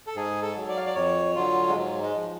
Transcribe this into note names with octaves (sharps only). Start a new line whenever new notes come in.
A4
G#2 G#4
A4
F#3
D5
F5
D5
F2 C#5
D3 F#3 F4
G#3
G#2 F#3
G#3
F3